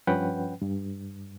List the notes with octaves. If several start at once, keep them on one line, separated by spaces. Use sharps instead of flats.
G2 F3 C#4 B4 F#5 G5
G2